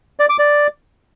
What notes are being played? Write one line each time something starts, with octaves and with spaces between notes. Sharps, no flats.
D5
D6
D5